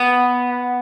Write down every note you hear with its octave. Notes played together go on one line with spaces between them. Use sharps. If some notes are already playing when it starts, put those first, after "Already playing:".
Already playing: B3